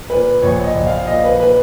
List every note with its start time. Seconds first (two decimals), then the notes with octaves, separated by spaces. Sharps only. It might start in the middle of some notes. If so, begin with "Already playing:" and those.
0.10 A#2 B4
0.42 A#1 C#5
0.64 D#5
0.75 A#1
0.87 F5
1.07 A#2 D#5
1.24 B4
1.40 A#2 B4